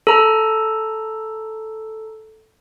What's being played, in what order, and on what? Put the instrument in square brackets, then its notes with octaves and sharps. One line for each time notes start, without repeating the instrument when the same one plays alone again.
[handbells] A4 A#5